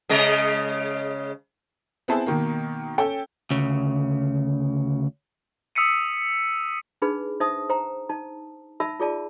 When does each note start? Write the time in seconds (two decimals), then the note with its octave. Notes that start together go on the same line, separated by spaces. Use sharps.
0.09 C#3 G#3 D#5
2.08 B3 C4 E4 G#4 A5
2.26 B2 D#3 A#3
2.98 C#4 A4 G5
3.50 D2 C#3
5.75 D#6 E6 B6 C#7 D#7
7.02 D4 D#4 G#4 B4 B5
7.40 D#4 C5 E5 A5 D#6
7.69 C5 G5 A#5
8.09 D#4 A5
8.80 D#4 E5 A5 B5 E6
9.00 F4 G#4 D5 A5